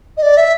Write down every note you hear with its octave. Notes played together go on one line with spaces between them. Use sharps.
D#5
D5
E5